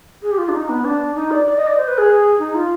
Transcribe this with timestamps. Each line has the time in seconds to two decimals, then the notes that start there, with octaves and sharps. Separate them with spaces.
0.23 G#4
0.32 G4
0.38 F4
0.49 D4
0.54 D#4
0.69 B3
0.85 D4
1.15 D#4
1.31 D5
1.46 D5
1.57 D#5
1.67 D5
1.77 C5
1.88 B4
1.98 G#4
2.39 D#4
2.55 F4